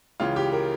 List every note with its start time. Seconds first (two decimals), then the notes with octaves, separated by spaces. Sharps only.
0.20 C#2 C#3 E3 F4
0.36 G4
0.52 A#4